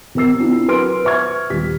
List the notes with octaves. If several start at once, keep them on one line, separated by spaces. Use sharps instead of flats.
C3 C4 A#4 E6 C7
C4 D4 E4 F4
F#3 A#4 B4 C6 F6 D7
B4 C5 E5 C#6 F6 G#6
D#1 G3 B6